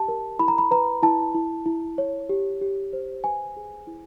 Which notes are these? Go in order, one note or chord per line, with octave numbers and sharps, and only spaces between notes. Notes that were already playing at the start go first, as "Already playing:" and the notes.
Already playing: G4 A5
A#4
E4 B5
A#5
B5
B4 A#5
E4 A5
E4
E4
C#5
G4
G4
C5
B4 G#5
G#4
E4